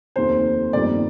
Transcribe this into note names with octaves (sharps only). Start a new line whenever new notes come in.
F1 D#2 D#3 C5
G1 F2 D#3 G3 A#3 D5